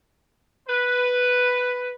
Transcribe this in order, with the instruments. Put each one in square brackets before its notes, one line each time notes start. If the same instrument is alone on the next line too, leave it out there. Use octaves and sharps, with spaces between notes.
[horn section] B4